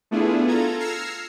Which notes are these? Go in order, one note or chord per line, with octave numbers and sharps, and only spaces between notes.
A3 B3 D4 E4 F4 G#4
F4 A4 A#5 G#6
E6 F6 G#6 A#6 C7 C#7